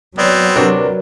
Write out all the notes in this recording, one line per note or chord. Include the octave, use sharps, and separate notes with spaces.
F#3 B3 C4 C#5 D5
C3 D4 F#4 A#4 B4 D5